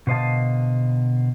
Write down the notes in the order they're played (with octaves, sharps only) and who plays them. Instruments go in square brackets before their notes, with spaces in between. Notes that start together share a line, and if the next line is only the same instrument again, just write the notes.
[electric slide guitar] B2 D3 C5 D#5 F5 A5